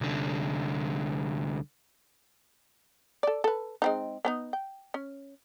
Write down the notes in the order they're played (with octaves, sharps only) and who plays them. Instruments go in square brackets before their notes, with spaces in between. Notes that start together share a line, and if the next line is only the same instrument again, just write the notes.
[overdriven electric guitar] C2 D3
[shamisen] A4 D5
A4 B4
G#3 C4 D#4
B3 C#4 D#4
G5
C#4